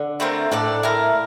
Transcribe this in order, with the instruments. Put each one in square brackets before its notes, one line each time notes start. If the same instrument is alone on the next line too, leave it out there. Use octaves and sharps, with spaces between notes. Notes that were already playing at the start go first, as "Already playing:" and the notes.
Already playing: [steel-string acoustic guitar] D3
[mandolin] A3 C4 F4 A#4
[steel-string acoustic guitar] A2 [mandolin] D4 A4 D5
[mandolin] E4 A#4 F5